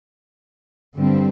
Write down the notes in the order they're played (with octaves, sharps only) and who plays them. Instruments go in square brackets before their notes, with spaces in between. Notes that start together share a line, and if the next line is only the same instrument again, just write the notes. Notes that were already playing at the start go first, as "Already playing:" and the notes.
[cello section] G2 D3 G3 C4